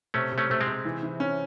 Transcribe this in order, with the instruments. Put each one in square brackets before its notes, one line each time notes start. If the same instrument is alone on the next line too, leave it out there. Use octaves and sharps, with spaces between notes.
[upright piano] C3 [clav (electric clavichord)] A3 C#4
[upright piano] C3
[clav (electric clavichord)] A3 C#4
[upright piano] C3 [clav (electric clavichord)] A3
[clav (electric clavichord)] G#3 C4
[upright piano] C3
E3
E3
C#4